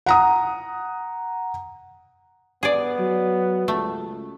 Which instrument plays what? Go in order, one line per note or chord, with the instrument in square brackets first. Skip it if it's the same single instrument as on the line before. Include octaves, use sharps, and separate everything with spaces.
[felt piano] F#5 A#5 D#6
[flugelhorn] B3 [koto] G#4 D5
[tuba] F#3
[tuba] C#2 [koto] A3